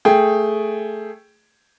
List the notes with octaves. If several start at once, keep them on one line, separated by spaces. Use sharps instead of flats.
A3 G#4 G5